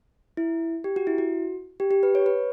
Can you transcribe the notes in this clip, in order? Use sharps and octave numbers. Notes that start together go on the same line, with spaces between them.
E4
G4
F#4
E4
F#4
G4
G4
B4
C#5
B4